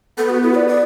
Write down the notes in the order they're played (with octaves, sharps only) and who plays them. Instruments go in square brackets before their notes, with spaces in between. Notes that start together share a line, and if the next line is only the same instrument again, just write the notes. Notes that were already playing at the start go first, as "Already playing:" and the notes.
[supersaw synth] B3 [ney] A4
[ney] F#4
E4
D5
D5